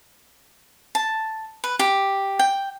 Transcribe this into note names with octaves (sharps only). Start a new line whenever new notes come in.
A5
B4
G4
G5